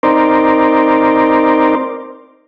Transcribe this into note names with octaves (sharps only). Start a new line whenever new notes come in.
C4 D#4 A#4 C5 D5